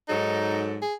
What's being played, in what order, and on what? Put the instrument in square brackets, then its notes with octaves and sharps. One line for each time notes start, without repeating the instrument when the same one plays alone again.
[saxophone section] G#2 F#3 A4 [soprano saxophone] D#4
[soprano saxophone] G#4